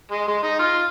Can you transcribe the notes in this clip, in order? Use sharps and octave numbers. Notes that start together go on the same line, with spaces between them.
G#3
G#3
D#4
F4